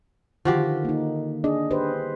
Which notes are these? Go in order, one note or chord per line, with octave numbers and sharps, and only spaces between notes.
D3 D#3 F3 F#4 G4
A#3 D#4
D4 G#4 D#5
G4 B4 C5